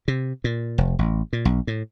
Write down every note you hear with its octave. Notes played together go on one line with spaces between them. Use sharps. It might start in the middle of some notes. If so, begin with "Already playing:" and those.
C3
A#2
F1
A1
A#2
B1
A2